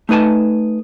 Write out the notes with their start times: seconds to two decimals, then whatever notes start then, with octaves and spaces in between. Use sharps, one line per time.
0.09 A3 D#4 B4 G#5 A5